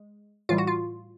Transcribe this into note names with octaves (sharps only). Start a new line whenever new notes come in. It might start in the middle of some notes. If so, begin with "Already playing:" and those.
Already playing: G#3
A2 E3 G3 F4
F#4
F4